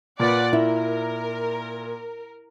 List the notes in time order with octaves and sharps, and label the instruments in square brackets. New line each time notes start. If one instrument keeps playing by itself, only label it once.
[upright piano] A#2 [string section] B4 D5 F#5
[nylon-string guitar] E4 [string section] A#4